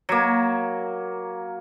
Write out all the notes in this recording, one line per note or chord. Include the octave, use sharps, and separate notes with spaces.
F#3 A#3